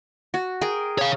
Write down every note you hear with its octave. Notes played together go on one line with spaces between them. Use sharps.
F#4
G#4 A#4 G5
C#5 F5